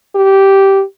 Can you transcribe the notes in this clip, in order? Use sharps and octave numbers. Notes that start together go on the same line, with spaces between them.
G4